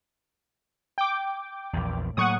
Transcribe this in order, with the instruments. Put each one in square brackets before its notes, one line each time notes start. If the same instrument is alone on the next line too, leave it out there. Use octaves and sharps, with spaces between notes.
[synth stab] G5 D6
[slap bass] A#1 E2
[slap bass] A2 F#3 A#3 [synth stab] F#5 C#6 D#6